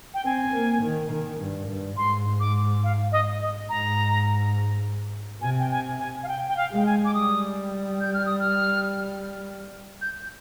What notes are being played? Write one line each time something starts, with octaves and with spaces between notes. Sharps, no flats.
G5
C4 G#5
A#3
D#3
D#3
G2
G2
G#2 C6
D6
F5
D#5
D#5
G#2 A#5
C3 G#5
G5
G#5
G#5
F5
G5
G5
F5
G#3
G5
G#5
D6
G3 D#6
G6
F6
D#6
F6
G6